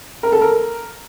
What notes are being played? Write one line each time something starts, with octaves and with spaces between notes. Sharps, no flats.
A#4
A4
A#4